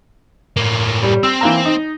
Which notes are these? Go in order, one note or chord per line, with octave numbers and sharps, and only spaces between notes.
A2 A#3
G3
C4 E6
E3 A#3 A#5
D#4